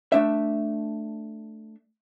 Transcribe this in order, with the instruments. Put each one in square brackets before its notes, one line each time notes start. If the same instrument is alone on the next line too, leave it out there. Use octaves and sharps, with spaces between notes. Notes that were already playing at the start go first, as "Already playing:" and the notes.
[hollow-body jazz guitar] A3 D4 E5